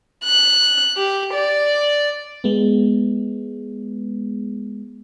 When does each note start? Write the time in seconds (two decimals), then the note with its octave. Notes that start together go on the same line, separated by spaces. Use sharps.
0.24 F#6
0.97 G4
1.34 D5
2.44 G#3 B3